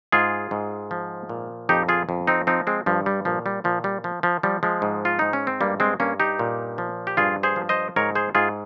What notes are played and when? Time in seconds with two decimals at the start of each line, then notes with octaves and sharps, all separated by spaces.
0.12 G#2 F4 G#4
0.51 G#2
0.91 F3
1.29 A#2
1.69 F2 D#4 G4
1.89 F4 G#4
2.09 F2
2.27 C4 D#4
2.47 F3 C4 D#4
2.67 G#3 C4
2.86 G2 F3
3.06 G3
3.25 A#2 F3
3.46 G3
3.64 A#2 F3
3.84 G3
4.04 F3
4.23 F3
4.43 F3 G3
4.63 F3 G#3
4.82 G#2
5.05 F4
5.19 G#2 D#4
5.33 C#4
5.47 C4
5.61 G2 G3 A#3
5.80 G#3 C4
6.00 G2 A#3 C#4
6.20 D#4 G4
6.39 A#2
6.78 F3
7.07 G4
7.17 G2 F4 G#4
7.43 G#4 C5
7.56 F3
7.69 C5 D#5
7.96 G#2 A#4 C#5
8.15 G#4 C5
8.35 G#2 F4 G#4